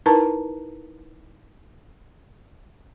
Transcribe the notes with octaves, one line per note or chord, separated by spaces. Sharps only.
D#4 E4 A#4 B4 A5 A#5